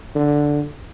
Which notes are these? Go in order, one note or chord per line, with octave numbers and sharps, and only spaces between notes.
D3